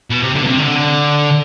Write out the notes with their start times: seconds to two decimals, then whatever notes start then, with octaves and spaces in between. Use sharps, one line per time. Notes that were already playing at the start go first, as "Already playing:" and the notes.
0.10 B2
0.22 C3
0.35 D3
0.43 B2
0.47 C3
0.59 D3